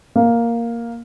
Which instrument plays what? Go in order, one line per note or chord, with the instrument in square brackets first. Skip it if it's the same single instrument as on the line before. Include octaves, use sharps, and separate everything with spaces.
[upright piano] A#3